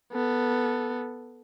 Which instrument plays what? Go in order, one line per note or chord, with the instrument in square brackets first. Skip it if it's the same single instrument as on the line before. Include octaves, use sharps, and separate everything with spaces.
[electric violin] B3 A4